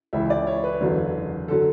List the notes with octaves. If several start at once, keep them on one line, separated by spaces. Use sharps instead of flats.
C#2 C#3 E3 E5
D5
C#5
B4
F#1 E2 D3 F#3
D3 F#3 A4